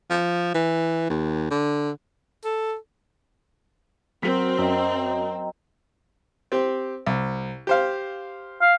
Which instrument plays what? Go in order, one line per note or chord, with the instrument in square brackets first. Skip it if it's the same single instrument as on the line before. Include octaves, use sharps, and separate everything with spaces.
[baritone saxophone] F3
E3
D#2
D3
[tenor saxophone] A4
[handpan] F#3 F#4 A#4 [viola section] C4 [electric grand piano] B6
[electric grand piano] F#2 [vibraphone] D#5 G5 A#5
[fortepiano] C4 G4
C2
G4 C5 F5
[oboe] F5